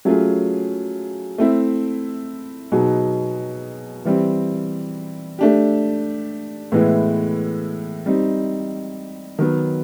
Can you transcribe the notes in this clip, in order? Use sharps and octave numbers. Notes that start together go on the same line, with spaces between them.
F#3 A3 C#4 F4 G#4
A3 C4 E4
B2 F#3 B3 D#4 G#4
E3 G3 C4
A3 D4 G4
A2 E3 G#3 B3 E4
G3 C4 D#4
D#3 F#3 B3